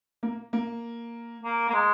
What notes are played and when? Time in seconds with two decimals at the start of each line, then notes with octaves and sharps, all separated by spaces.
0.23 A#3
0.53 A#3
1.44 A#3
1.70 A#3
1.74 G#3